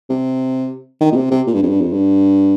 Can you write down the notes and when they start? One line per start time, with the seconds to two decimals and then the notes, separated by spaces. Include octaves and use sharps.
0.09 C3
1.01 D#3
1.12 A#2
1.16 C3
1.31 C3
1.47 A#2
1.54 G2
1.62 F2
1.69 G2
1.81 F2
1.93 G2